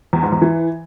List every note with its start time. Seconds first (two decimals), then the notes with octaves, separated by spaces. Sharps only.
0.13 E2
0.23 G#2
0.32 E2
0.42 E3